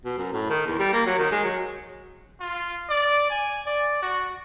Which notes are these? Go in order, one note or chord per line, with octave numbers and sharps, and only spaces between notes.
B2
F#2
A2
D#3
E2
G3
A#3
F#3
D#3
G#3
F#3
F4
D5
G#5
D5
F#4